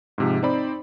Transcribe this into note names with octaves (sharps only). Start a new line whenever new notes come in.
G#2 C3 F3
C4 D#4 C5 D5 B5